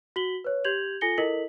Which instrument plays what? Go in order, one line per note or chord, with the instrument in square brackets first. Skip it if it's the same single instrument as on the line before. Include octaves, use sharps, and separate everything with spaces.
[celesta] F#4 B6 F#7 G7
B4 C#5
G4 G6 G#6 F7 F#7
F4 A4 G#5 A#6 C#7 G7
E4 A4 A#4 D#5 B6 F#7